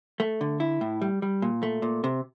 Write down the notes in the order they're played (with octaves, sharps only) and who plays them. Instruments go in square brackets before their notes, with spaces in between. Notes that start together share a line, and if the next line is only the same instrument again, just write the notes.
[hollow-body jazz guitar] A3
D3
E4
A2
G3
G3
A#2
A3
A#2
C3